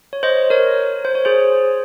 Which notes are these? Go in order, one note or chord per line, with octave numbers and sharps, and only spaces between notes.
C#5
C5 D#5
A#4 C#5
C5
C#5
G#4 C5